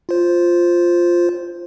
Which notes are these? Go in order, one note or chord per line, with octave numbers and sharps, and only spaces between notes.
F4 C5